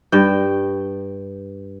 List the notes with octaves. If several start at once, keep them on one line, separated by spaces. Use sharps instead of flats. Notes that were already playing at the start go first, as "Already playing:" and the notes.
G2 G5